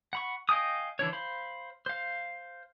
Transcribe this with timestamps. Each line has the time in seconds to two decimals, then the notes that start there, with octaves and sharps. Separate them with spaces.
0.13 F#5 B5 C#6
0.49 D#5 F5 G5 G#5 D#6
0.99 D3 E3 D4 C#5
1.13 C5 F5 B5
1.86 C5 F5